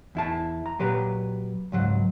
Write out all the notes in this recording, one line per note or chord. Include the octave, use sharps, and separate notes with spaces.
E2 E4 A5
A#5
A#2 F#3 G4 B4 A#5
C#2 G#2 F#3